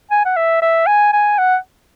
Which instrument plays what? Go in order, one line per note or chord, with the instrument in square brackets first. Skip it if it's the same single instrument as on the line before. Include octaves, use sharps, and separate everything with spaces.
[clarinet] G#5
F#5
E5
E5
G#5
G#5
F#5